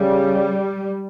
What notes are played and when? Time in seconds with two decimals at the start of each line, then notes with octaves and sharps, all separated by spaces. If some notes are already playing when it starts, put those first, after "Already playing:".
Already playing: C#3 G3